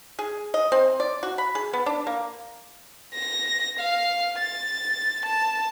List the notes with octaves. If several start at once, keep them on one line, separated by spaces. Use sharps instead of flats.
G#4
D#5
C4
D5
F#4
B5
G#4
B3
D4
A#3
A#6
F5
A6
A5